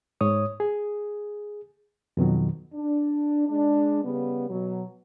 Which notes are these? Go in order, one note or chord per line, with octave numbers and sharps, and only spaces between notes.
G#2 C#5 D#6
G#4
F2 B2 D#3 F#3
D4
G#3 D4
C#3 G3 B3
B2 F#3